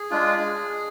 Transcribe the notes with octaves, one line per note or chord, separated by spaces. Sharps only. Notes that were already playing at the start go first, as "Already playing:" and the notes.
Already playing: G#4
G#3 D4 F4